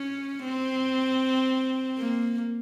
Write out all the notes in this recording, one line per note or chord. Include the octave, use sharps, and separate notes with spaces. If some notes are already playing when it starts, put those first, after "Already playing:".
Already playing: C#4
C4
A#3